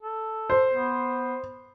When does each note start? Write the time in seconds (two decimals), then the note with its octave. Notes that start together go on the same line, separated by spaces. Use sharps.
0.02 A4
0.50 C5
0.73 B3